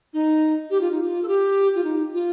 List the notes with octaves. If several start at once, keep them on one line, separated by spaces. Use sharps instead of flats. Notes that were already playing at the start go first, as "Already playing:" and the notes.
D#4
G4
F4
D#4
F4
A4
G4
F4
D#4
F4